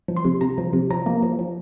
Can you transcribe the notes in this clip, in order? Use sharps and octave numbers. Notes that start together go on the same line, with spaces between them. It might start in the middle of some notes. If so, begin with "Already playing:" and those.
F3
C6
C3
C3 A#5
F3
C3
F3 A#5
A#3
F3
F3